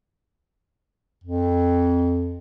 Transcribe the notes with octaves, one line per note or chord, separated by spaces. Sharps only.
F2